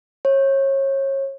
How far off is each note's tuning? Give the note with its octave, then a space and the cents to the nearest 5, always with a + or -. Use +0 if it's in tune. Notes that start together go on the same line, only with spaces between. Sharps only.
C#5 -30